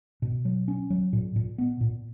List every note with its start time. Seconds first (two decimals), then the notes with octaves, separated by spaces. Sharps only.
0.22 B2
0.45 F#3
0.68 C#4
0.90 F#3
1.13 A#2
1.36 A#2
1.58 B3
1.81 A#2